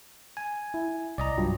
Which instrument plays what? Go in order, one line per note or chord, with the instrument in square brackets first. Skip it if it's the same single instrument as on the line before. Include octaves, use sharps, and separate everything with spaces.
[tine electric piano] G#5
[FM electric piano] E4
[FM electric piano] C2 [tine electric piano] D5 D#5 A#5
[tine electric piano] G2 [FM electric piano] F#3 F4